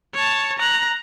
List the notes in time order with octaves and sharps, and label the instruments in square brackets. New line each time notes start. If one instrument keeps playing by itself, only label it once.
[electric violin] C#5 A5
A#5 F#6